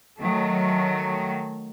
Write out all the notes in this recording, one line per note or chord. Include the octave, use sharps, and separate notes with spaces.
D#3 F#3 A3